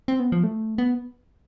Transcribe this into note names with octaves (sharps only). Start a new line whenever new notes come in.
C4
B3
F3
A3
B3